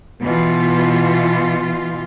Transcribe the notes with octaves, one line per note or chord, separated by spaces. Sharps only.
B2 E3 F4